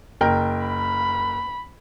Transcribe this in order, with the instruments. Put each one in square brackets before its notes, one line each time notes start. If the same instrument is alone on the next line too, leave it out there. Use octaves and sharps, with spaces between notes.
[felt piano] F#1 A#4 G5
[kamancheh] B5